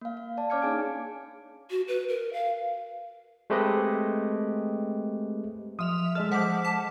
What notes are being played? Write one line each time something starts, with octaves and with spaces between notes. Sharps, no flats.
A#3 F5
F5
D5 F5 A5
C#4 C#5 D6 F6 G#6 C#7
A#3 D4 D#4 G#4 G#5 D7
F#4
B4
A#4
F5
G#3 A3 C4 G4 B4 D#5
F3 E5 D#6 F7
G#3 A4 D#5 E5 F6
F3 F#5 D6 B6
A5